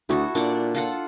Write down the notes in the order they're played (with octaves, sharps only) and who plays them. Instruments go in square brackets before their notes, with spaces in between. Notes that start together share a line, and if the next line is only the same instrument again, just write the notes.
[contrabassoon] D2 [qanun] E4 F#4 A4
[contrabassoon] A#2 [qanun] D4 D5 F#5
[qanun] F4 A4 F#5